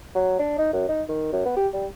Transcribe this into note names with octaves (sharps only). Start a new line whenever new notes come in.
F#3
D4
D#4
F#2
D#4
D#3
F#2
B3
G4
G3